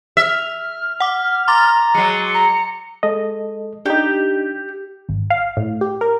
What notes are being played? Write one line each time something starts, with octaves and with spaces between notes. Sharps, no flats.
E5 F6
F#5 D6
A#5 C6 D6 A6
F#3 G#3 C#7
A#5
G#3 A4 D#5
D4 D#4 G4
G#1
F5
A2
G4
A#4